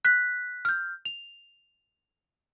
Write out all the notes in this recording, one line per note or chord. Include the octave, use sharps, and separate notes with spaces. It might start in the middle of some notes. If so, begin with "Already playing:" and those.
F#6 B6
F6 G6
F7